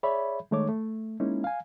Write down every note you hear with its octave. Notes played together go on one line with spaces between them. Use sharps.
G#4 C#5 D5 E5 B5
D#3 G#3 A3 D#4 C#5 D6
A3
G#3 A#3 C#4 D#4 E4
F5 G#5